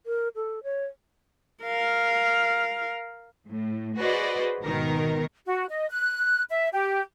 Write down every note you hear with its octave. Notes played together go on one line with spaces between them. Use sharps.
A#4
A4
C#5
A#4 F5
A2
F#4 G#4 B4 C5 D5 D#5
G#1 B2 D#3 A#4
F#4
D#5
F#6
E5
G4